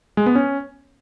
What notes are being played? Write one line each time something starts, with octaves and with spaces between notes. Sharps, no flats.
G#3
B3
C#4